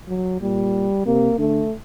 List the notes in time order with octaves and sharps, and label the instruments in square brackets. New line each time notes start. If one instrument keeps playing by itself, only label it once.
[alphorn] F#3
[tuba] A#2 [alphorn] G3
[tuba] C3 [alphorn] A#3
[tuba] D3 [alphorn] A3